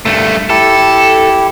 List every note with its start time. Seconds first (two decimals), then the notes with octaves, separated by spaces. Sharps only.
0.05 G2 A3
0.50 E4 G4 A4